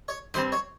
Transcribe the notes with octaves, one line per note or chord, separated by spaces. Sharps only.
C#5
G2 G3 C4 C5
C#5